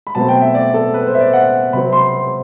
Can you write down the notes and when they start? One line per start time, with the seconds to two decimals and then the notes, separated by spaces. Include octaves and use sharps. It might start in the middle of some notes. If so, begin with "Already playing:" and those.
0.07 B5
0.15 B2 F#3 A3 C4 A5
0.28 G5
0.41 E5
0.55 D5
0.74 A4
0.94 B4
1.07 C5
1.14 E5
1.20 D5
1.33 F#5
1.73 C3 F#3 C4 B5
1.93 C6